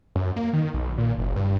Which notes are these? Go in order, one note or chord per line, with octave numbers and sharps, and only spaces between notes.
F#2
A#3
D#3
B1
A#2
F#1
G2